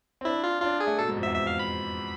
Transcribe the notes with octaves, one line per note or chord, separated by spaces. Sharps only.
C4
D4 E4
F4
D4 F4
G#4
A3
B2 A4
G#2
F2
E5
E2
E5
F5
B5